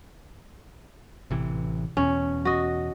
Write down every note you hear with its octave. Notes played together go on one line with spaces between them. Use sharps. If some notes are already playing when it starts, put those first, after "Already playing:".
A1 C3 E3
E2 B2 C#4
F#4 D#5